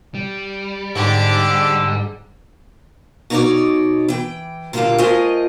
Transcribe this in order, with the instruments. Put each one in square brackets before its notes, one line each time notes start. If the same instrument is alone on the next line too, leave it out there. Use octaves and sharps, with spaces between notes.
[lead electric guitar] G3
[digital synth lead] G#2 [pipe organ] D3 E6 [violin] D4 G4
[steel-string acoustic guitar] B2 D#4 F4 B4 C#5 D5
E3 G5
A#2 D3 G3 A3 A#3 F4
A3 F4 A#4 C5 D#5 G#5